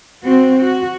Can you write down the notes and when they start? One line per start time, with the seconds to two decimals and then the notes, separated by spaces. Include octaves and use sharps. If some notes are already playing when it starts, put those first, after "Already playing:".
0.24 C4 F#4
0.59 F#4